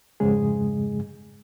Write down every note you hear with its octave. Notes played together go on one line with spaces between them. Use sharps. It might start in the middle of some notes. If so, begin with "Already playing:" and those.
F2 G#2 C#3 G#3 G#4